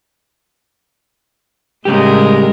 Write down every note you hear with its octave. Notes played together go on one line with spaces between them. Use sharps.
A2 C#3 G3 G#3 G4 A#4